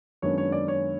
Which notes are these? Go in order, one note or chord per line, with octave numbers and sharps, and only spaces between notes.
F#2 D#3 G#3 B3 D4 C#5
C#5
D5
C#5